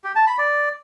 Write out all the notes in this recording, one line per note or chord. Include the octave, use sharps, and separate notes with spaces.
G4
A5
B5
D5